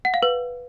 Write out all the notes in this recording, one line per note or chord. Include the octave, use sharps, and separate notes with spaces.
F#5
F5
B4